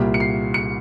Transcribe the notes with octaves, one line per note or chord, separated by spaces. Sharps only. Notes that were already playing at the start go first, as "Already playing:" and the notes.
Already playing: C2 A#2 G3 A#3
C#7
C7
C#7